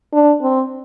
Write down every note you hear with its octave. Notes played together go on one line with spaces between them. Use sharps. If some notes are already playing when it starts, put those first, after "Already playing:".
D4
C4